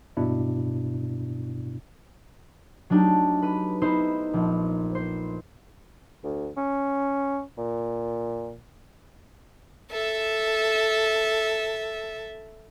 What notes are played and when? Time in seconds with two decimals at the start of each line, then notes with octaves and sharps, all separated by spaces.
0.17 G2 B2 D4 E4
2.90 F#3 A3 D4 D#4 G4
3.42 B4 D#7
3.81 B3 D#4 E4 C5
4.33 A#1
4.95 C5
6.24 D2
6.57 C#4
7.58 A#2
9.91 A4 E5